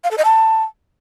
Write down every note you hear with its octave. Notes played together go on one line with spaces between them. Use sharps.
F5
A4
D#5
A5